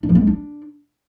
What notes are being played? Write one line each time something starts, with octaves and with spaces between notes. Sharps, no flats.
D4
F3
B3
G#3
D4